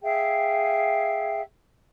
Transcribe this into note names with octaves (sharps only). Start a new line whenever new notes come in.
G#4 E5 F5 G5